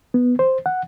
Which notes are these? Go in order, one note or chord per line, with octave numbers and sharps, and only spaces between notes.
B3
C5
F#5